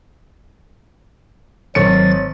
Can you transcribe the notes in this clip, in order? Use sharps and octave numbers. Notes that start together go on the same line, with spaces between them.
G#1 F#3 C#5 A6 C#7